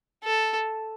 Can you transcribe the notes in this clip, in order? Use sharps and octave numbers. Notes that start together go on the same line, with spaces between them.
A4